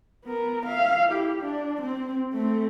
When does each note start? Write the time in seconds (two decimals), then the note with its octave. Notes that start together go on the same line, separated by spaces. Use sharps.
0.24 B3 A#4
0.65 E5 F5
1.08 E4 G4
1.41 D4
1.82 C4
2.33 A3 C4